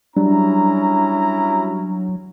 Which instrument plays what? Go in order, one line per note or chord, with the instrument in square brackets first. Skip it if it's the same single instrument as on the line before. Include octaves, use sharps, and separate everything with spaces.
[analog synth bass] F#3 [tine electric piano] G3 [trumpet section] C#4 E4 A#5 [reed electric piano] D4